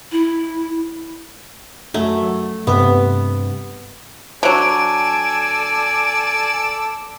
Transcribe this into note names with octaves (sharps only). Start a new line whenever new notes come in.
E4
F#2 F#3 A3
F#3
G2 C3 B3
D3 F#3 A4 D5 G#5 D7